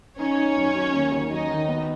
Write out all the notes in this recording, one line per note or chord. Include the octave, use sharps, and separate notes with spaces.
C#4 D#4 C#5
D#4
F#2
F#3
D#2
D#2
F#3 D#4 D#5
D#3
B3